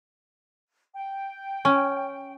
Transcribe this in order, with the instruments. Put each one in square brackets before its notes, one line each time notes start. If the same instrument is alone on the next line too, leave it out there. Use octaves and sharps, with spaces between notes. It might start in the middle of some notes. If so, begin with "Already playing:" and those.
[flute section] G5
[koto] C#4